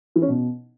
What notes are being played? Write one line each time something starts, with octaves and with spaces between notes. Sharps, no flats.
E3
C#4
B2